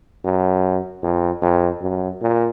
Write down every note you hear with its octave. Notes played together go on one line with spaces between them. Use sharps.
F#2
F2
F2
F#2
A#2